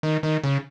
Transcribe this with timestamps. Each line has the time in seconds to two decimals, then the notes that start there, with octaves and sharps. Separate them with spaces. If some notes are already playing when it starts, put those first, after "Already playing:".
0.03 D#3
0.23 D#3
0.44 C#3